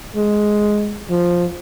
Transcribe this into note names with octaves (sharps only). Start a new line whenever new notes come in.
G#3
F3